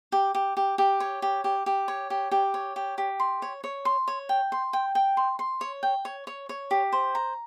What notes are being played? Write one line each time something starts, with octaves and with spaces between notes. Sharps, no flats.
G4
G4
G4
G4
C#5
G4
G4
G4
C#5
G4
G4
C#5
G4
G4
C6
C#5
C#5
C6
C#5
G5
C6
G5
G5
C6
C6
C#5
G5
C#5
C#5
C#5
G4
C5
A#5